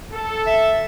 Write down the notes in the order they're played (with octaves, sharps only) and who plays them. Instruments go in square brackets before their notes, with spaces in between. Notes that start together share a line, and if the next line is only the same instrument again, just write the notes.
[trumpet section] A4
[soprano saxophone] E5